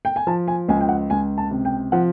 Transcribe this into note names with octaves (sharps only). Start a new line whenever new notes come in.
G5
G#5
F3 A5
G#5
C#2 G#5
G5
F#5
C#2 G#5
A5
C3
G5
F3 F#5